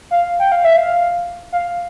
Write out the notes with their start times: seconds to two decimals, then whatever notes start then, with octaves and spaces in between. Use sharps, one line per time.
0.11 F5
0.39 G5
0.52 F5
0.65 E5
0.77 F5
1.52 F5